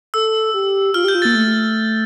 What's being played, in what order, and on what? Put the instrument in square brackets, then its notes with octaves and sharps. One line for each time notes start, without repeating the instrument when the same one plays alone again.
[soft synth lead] A4 [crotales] E6
[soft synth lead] G4
[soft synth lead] F4 [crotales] F6
[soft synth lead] G4 [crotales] G6
[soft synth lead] F4
[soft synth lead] A#3 [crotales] A6
[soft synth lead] A3